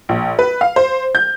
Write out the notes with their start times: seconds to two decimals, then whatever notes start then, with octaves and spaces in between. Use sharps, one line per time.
0.09 A#1
0.39 B4
0.61 F5
0.76 C5
1.15 G6